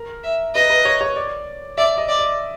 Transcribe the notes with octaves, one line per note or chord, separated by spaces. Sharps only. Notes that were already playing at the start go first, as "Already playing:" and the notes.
Already playing: A#4
E5
B4 D#5
B4
C#5
C#5
D5
D5 E5
D#5
D5
D5